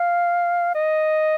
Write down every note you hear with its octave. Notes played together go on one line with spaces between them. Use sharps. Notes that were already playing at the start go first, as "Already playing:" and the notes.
Already playing: F5
D#5